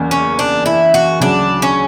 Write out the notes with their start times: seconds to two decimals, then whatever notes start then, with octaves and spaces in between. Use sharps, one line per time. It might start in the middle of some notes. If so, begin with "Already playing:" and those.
Already playing: F#1 E2 A#3
0.11 C#4
0.39 D4
0.66 E4
0.94 F#4
1.20 D2 C#3 F#3 D4
1.62 C#4